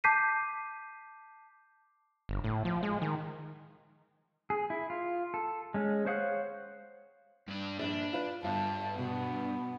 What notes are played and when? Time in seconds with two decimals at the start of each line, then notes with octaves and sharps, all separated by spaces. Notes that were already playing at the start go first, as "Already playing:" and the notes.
0.04 A5 D6 G6 B6 C7 D#7
2.29 G1
2.44 A2
2.65 F3
2.83 G#3
3.02 D#3
4.50 G#4
4.70 E4
4.90 F4
5.34 A4
5.74 G#3 C#4
6.06 C5 C#5 F5 F#5 D#6
7.48 G2 D4
7.79 A#1 G2 D4
8.13 F4 B4
8.44 G1 G2 F4 A5
8.98 B2 B3